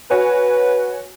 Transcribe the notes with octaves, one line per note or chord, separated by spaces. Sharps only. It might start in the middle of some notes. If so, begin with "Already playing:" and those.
F#4 B4 C#5 G#5